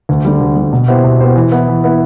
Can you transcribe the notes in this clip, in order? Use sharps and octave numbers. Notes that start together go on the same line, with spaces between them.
D2
D3 G3
D2
D3 G3
B2
B3 E4 G4 C5
B2
B3 E4 G4 C5
E3
B3 E4
E3
B3 E4